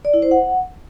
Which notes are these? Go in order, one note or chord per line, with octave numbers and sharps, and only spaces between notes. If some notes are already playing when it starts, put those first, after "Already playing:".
D5
E4
C5
F#5